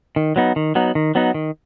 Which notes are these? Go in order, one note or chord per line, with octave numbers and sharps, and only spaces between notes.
D#3
F#3 B3 D#4
D#3
F#3 B3 D#4
D#3
F#3 B3 D#4
D#3